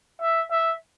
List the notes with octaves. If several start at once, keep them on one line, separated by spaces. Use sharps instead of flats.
E5
E5